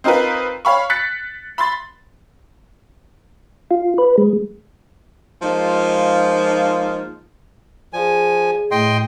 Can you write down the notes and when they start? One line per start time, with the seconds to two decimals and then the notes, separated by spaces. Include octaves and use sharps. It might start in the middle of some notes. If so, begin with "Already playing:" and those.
0.04 C4 D#4 F4 A#4 B4
0.65 C#5 F5 B5 C#6
0.90 F#6 A6 B6 C#7
1.58 B5 C6 A6
3.71 F4
3.98 B4
4.18 G#3
5.43 F3 G#3 A#3 D#4 F4
7.93 F3 G#4 D5 G#5
8.71 A2 D#5 G5 C6